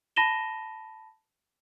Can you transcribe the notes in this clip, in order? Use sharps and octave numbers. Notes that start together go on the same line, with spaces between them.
A5 B5 A#6 D#7 E7 G7